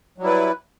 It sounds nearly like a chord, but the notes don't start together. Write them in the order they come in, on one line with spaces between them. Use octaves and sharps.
F#3 G3 E4 B4